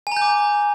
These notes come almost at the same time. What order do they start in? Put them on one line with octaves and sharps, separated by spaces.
G#5 A#5 G6 D6